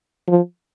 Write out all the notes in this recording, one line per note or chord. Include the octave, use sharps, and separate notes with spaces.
F3